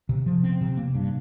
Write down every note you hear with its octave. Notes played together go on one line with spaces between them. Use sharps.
C3
F3
C4
C3
A#3
G2